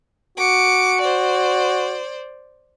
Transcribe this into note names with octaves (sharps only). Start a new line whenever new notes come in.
F#4 D6 C#7
C5 D5